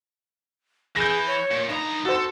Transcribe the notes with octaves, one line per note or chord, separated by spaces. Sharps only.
E3 G#4 G6 A#6
C#5
A#2
G2 D#4 A#5
F#4 A4 C5